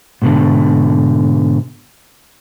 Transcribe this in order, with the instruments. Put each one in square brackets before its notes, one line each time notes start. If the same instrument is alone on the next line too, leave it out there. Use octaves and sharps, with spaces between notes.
[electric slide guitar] G#2 B2 D3